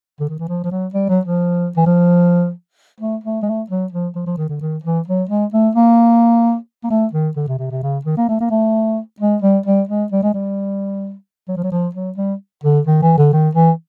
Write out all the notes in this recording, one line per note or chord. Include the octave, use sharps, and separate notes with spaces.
D3
D#3
E3
F3
F3
F#3
G3
F#3
F3
E3
F3
A3
A3
G#3
A3
F#3
F3
F3
F3
D#3
D3
D#3
E3
F#3
G#3
A3
A#3
A#3
A3
D#3
D3
C3
C3
C3
C#3
D#3
A#3
A3
A#3
A3
G#3
G3
G3
G#3
G3
G#3
G3
F#3
F3
F#3
F3
F#3
G3
D3
D#3
E3
D3
D#3
E3